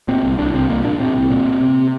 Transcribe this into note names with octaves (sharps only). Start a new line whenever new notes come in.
A#2 C4
C2
C2 D4
C2 C4
C2 A#3
A#2 D4
A#2 C4
C2
A#2
A#2
C3